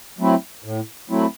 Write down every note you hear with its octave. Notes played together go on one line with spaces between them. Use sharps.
F#3 A3 C4 E4
A2
F#3 A3 C4 E4